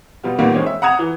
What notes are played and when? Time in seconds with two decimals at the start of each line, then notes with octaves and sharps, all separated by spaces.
0.24 B2 G3 F4
0.39 A#2 D#3 G3 A#3 B3
0.54 D#3 G#3 C4 C#4
0.66 E5
0.82 F#5 A#5 D#6 G#6 E7 F7
0.99 E3